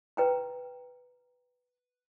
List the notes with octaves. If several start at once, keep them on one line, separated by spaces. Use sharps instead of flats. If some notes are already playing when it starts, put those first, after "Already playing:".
B4 G5 A#5